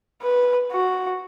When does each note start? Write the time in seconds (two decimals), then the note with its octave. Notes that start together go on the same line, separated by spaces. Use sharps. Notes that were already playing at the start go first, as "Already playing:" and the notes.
0.22 B4
0.72 F#4